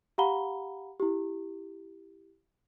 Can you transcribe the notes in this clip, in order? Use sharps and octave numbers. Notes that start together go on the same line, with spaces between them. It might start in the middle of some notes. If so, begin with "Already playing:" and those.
G4 F5 F#5 A#5 B5 G7
E4 G4